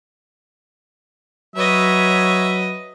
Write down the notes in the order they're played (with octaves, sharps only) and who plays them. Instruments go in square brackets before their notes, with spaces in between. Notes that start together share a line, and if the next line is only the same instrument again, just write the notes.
[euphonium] F#3 [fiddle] B4 D#5 [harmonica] C#5 E5